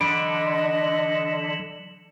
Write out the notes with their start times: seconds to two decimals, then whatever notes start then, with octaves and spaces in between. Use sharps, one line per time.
0.01 D3 E3 F#3 D#5 B5 D7